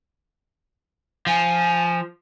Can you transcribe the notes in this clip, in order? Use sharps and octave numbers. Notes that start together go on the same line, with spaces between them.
F3 G#5